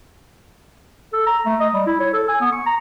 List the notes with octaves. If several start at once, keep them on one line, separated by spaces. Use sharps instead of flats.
A4
A#5
A3
D#5
G3
E4
C#5
A4
G#5
B3
C#6
A#5